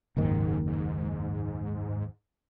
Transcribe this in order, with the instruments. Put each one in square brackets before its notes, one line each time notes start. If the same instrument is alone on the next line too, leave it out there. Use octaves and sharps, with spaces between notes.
[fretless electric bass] F#1 D#2 D#3 [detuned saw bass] G#2
[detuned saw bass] G#2